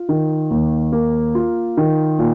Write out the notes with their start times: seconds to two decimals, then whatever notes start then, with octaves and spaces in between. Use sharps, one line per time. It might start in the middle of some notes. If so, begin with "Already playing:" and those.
Already playing: F4
0.09 D#3
0.50 D#2
0.92 A#3
1.35 F4
1.77 D#3
2.19 A#2